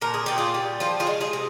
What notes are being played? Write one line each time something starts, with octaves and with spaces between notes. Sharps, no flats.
A#2 A#4
G#4
A#2 G4
F4 G#4
G3
F3 F4 G#4
F4 G#4
G#3
F4 G#4
C3